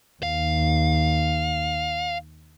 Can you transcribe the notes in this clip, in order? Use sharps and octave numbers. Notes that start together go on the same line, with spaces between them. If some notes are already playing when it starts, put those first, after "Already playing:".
D#2 F5